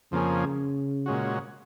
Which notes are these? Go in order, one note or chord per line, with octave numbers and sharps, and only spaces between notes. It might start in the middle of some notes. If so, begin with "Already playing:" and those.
F2 C#3 F3 A#3 C#4 G#4
A#2 G#3 C#4 F#4